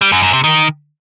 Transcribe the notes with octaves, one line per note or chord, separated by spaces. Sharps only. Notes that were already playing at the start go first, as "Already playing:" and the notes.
G3
F#2
F#2
C3
D#3